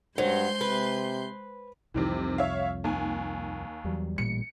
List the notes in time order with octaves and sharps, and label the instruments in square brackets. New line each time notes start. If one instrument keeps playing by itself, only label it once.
[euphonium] G2 [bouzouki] F#3 [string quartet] G#3 C6 G6 [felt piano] C5
[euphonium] C3 [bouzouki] B4
[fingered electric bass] C2 F2 [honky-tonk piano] C3 D#3 E3
[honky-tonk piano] C#5 E5 F5
D#2 G#5
[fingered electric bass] E2 F#3 G3
[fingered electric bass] A1 A#2 G3 [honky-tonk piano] C#7